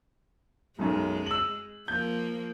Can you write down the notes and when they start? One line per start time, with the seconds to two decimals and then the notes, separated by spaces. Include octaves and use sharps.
0.79 B1 F#2 G#3
1.26 E6 F#7
1.88 F3 A#3 G6